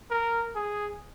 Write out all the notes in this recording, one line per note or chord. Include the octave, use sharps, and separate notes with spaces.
A#4
G#4